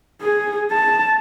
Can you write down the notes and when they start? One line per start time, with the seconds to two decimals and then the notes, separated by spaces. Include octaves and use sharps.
0.21 G#4
0.71 A5